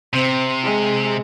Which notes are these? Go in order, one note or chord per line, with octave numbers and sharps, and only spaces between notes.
C3 C4
G#3